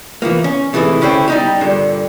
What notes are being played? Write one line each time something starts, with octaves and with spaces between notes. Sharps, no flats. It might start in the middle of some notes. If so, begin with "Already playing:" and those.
E3 F3 A#3
C#4
G#2 C3 E3 A3 E4 G#4
D3 C#4 E4 C5 G5
G3 D#4 G4
G2 A#2 D3